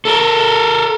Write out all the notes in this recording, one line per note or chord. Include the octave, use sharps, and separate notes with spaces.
A4 A#4